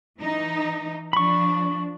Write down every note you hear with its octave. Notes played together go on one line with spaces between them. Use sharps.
E3 D#4
F3 D4 B5 C#6